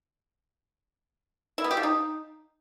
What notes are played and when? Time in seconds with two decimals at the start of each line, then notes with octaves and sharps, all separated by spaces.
1.58 E4
1.64 B3
1.71 G4
1.77 F3
1.83 D#4